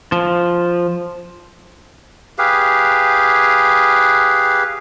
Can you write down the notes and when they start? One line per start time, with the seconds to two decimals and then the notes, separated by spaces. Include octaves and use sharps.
0.12 F3
2.39 G4 G#4 B4 F5